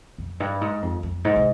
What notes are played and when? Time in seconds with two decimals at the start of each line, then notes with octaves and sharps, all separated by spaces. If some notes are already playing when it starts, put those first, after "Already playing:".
0.18 F2
0.40 G2
0.61 G#2
0.82 F2
1.03 F2
1.25 G#2
1.36 C3